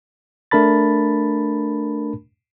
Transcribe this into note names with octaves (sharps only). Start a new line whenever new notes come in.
A3 D4 A#4 A5 B5 A6